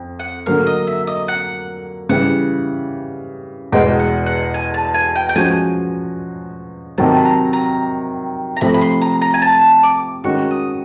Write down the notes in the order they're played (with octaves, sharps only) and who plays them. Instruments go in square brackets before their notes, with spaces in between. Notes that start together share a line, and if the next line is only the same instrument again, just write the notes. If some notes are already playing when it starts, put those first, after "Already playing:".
Already playing: [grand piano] F2
[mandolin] F#5
[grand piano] D3 F#3 A#3 [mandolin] F5
[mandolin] D#5
E5
D#5
F#5
[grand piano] C#3 E3 G3 [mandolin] F#5
[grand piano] E2 B2 G#3 B3 [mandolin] G5
[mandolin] F#5
F#5
G#5
A5
G#5
G5
G5
[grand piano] F3 G#3 C#4 F#4 [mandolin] G#5
[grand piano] C3 D#3 F#3 [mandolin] A5
[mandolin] B5
A#5
A#5
A#5
[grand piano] C3 F3 A3 [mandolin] B5
[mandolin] B5
C6
A#5
A#5
G#5
A5
D6
[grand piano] D#3 G#3 C#4 F#4 [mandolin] C#6
[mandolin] D#6